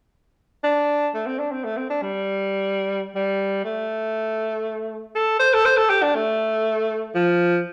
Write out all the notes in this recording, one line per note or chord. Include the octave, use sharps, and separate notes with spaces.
D4
A3
C4
D4
C4
A3
C4
D4
G3
G3
A3
A4
C5
A4
C5
A4
G4
D4
A3
F3